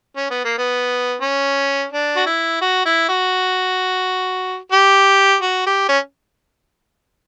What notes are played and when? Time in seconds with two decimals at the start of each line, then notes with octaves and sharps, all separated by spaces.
0.16 C#4
0.30 B3
0.44 A#3
0.58 B3
1.21 C#4
1.92 D4
2.16 F#4
2.27 E4
2.61 F#4
2.86 E4
3.09 F#4
4.72 G4
5.42 F#4
5.66 G4
5.89 C#4